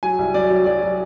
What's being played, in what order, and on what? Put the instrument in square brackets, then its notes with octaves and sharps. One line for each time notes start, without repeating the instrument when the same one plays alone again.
[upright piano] F#3 G#5
C2
F#3 D5
F#3
F#3 D5
F#3